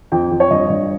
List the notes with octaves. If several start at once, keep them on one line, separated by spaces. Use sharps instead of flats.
F2 G5
F2
C#5
G2 D#5
G2 D#5